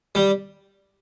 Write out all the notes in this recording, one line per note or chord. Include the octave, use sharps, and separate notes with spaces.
G3